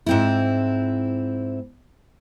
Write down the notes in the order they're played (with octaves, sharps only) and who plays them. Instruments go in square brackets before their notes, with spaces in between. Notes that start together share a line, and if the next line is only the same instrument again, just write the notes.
[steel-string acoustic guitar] G#2 C4 E4